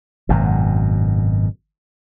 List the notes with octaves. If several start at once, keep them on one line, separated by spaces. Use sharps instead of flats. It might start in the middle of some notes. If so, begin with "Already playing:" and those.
G#1 F#2 B2